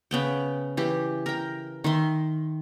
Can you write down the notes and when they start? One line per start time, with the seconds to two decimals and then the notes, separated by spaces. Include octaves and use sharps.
0.11 C#3 B3 G5
0.77 E3 G4
1.26 A#4 G5
1.84 D#3 E5 C6